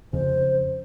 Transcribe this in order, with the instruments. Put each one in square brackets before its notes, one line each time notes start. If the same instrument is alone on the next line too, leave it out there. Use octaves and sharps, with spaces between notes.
[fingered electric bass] F2 C#3 [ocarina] C5